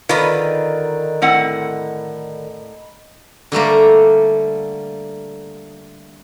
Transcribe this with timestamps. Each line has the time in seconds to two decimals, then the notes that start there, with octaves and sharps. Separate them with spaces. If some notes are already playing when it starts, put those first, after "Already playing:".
0.09 D3 D#3 F4 B4 D#5 A#5 B5
1.22 A2 C4 F#5
3.52 D3 G3 A3 A#3